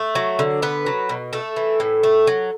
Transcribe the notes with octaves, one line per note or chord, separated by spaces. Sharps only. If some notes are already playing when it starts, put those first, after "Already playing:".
Already playing: A3
F#3
D3
B3 B4
F#3
B2
A3 A4
E3
A2
A3
F#3